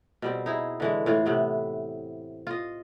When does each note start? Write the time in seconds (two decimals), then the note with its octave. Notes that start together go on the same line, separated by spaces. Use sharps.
0.22 B2 G3 C4
0.46 D#4 E4 G#4
0.80 D3 E3 G#3
1.06 A2 E3 F4
1.26 A2 C3 B3
2.47 F4 D#5